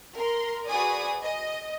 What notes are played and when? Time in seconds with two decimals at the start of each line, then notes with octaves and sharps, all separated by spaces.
0.15 A#4 A#5 C6
0.67 F#4 G#4 B4 D5 G#5 D#6
1.22 D#5